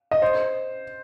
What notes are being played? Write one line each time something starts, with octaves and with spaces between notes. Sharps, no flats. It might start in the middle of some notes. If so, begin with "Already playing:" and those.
D#5
C5